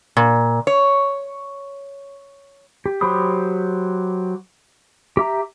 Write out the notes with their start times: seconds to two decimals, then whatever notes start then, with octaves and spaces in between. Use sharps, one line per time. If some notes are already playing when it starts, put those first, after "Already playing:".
0.17 A#2
0.67 C#5
2.86 G4
3.01 F#3 G4 C5 B5 D#6
5.17 G4 E5 A#5